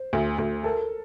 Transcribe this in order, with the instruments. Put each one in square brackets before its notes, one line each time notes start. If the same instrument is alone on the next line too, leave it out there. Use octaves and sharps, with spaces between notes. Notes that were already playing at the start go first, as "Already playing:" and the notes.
Already playing: [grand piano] C5
[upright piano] D2
D2
[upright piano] A4 [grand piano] A#4